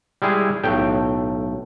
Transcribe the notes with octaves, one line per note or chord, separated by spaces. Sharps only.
G3 G#3 E4 G#4
B1 A2 G5